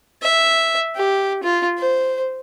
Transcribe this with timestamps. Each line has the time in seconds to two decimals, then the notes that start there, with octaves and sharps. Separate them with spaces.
0.22 E5
0.96 G4
1.43 F4
1.78 C5